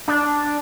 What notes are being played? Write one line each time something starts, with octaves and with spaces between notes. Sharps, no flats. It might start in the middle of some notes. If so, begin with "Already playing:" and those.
D4